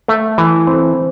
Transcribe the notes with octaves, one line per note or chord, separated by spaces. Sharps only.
A3 E5
E3
C4